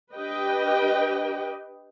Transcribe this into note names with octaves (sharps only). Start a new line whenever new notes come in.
D4 G4 B4 D#5 G5